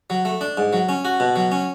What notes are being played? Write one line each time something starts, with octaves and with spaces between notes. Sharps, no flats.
F#3
A3
D4
G#2
F#3
C#4
F#4
B2
F#3
C#4